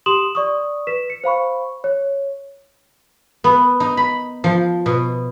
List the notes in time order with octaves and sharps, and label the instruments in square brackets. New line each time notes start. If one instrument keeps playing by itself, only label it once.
[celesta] G4 C6 D#6 E7 F#7
D5 C#6 D#6
B4 B6 E7
C#7
C5 F5 B5 C#6
C#5
[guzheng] B3
D#4
B5
F3
B2